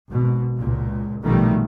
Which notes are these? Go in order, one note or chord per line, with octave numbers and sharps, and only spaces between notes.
G#1 B2
C#2 A#2
A#1 B2 D#3 F3 G3 A3